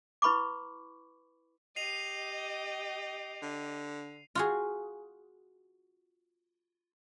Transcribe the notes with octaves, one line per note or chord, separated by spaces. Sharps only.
E4 B4 B5 C#6 D6
G4 D#5 C7 D#7 F7
D3
F4 F#4 G#4